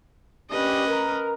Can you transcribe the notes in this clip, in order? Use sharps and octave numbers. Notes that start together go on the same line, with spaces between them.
A#3 C#4 D4 G4 B4 D#5
A#4